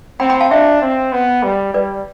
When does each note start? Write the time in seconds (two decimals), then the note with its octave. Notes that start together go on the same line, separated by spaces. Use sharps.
0.20 C4 G5 B5
0.30 G5 B5
0.40 F5 A5
0.51 D4 E5 G5
0.82 C4
1.12 B3
1.43 G3
1.74 G3 B4 D5